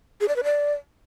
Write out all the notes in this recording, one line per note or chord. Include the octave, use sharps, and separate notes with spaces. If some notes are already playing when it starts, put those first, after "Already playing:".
G#4
D5
B4
D5